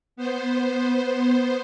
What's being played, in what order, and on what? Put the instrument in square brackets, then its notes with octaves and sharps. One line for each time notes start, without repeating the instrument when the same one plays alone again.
[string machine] B3 C5